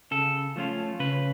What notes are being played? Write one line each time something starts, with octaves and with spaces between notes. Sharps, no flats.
C#3 A4
F3 A3 C#4 F4
C#3 B4